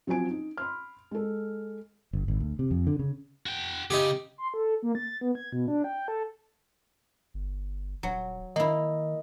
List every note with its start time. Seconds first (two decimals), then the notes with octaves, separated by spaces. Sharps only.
0.07 F3 F#3 C4 F#4 G#5 D7
0.27 C#4 D#4
0.58 B5 C6 F6
1.11 G#3 A4
2.13 G1
2.28 G#1
2.40 D2
2.59 C3
2.71 F2
2.87 D3
2.99 C#3
3.46 F#4 G5
3.91 C#3 D#4 G4
4.38 C6
4.54 A4
4.83 A#3
4.95 A6
5.21 B3
5.35 G#6
5.52 B2
5.68 D4
5.84 G5
6.08 A4
7.34 G1
8.03 D#1 F#3
8.56 D#3 A#3 E4 D#5